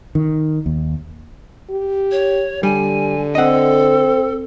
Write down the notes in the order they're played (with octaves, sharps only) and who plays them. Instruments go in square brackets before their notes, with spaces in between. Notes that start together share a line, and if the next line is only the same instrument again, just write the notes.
[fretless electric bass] D#3
D#2
[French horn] G4
[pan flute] C#5
[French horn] D3 [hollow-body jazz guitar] G3 [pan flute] G#5
[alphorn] C4 [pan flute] A4 [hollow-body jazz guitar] D#5 F#5